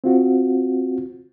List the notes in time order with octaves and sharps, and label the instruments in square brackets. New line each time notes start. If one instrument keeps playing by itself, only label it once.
[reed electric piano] C4 F4 F#4